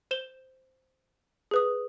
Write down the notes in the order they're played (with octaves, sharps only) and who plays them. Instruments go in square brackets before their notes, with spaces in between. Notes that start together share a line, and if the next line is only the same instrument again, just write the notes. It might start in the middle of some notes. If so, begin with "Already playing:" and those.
[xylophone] C5 E7 G7
G#4 B4 D#6